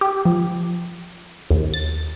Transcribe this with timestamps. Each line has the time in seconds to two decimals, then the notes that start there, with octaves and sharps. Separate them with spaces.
0.01 G4
0.25 F3
1.51 D#2
1.74 A6